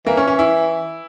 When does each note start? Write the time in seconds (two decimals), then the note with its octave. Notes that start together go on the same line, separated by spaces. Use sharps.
0.06 E3 A#3
0.17 C#4
0.28 C#4
0.39 E4